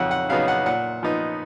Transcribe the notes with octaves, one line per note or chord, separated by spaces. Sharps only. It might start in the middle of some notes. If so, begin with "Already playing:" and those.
Already playing: F2 C#3 F#3 D#4 F#5
F#5
C#3 F#3 B3 D#4 F5
F#5
A#2 F#5
F3 B3 D#4